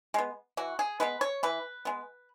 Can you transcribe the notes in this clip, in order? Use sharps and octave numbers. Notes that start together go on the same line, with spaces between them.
G#3 B3
E3 F#4
G#4
G#3 B3 B4
C#5
E3 B4
G#3 B3